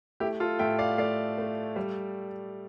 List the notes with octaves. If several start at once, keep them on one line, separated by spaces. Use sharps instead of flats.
A3 E4 G4
F4 A4
A2 E5 G5
D5 F5
A3 D5 F5
A3
G3